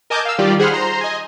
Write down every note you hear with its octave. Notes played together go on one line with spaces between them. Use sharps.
A#4 D#5 G#5 A5 D6 G6
F5 E6
D#3 G3 F4 G4 D5
G#4 C5 F#5 B5 C6 F6
C5 A#5 C6
D#5 G#5